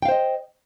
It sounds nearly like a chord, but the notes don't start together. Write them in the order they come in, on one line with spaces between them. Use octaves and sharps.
G5 F5 C5 D#5